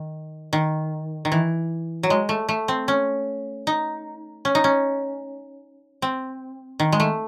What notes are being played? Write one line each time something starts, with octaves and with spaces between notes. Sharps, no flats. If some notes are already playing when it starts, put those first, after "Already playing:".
Already playing: D#3
D#3
D#3
E3
F#3
G#3
A3
A3
C4
C#4
D#4
C#4
D#4
C#4
C4
D#3
G#3
A3